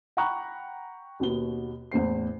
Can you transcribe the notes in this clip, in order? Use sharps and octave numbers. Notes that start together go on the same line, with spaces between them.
F#5 G5 A#5 B5 C#6 F#6
D#2 B2 B3 G7
E2 A2 C5 C7